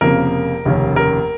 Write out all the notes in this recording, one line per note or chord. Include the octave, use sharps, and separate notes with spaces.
F1 F2 C#3 A#3 A#4
F1 D#2 C#3 A#3 C#4
A#4